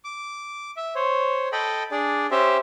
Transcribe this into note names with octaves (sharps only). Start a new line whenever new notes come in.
D6
E5
C5 C#5
A4 D#5 G5 B5
D4 G#4 D5
C#4 G4 C5 E5